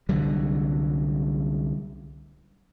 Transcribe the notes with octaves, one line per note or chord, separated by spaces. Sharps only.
C2 D3 F#3 G3